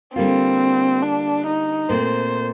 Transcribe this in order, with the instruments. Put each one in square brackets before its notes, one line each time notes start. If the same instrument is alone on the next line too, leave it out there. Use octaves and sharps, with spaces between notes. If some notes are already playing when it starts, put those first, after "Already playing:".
[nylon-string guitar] D3 G3 A#3 F4 [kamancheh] C4
[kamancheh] D4
D#4
[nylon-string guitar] A#2 A3 C4 [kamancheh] C5